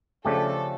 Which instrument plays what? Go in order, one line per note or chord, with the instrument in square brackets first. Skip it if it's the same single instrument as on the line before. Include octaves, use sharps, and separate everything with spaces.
[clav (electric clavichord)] C#3 F3 A3 D4 G4 [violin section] A4